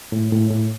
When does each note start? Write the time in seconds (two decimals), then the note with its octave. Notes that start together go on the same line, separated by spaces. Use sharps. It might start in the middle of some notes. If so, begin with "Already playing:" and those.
0.12 A2
0.32 A2
0.50 A2